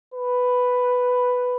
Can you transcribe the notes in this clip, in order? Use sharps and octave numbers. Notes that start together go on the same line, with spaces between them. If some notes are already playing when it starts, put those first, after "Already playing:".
B4